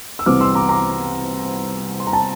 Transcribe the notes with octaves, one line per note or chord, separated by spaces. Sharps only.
E6
C2 C3 E3 D6 F6
C6 E6
A#5 D6
A#5 D6
C6
A#5
A5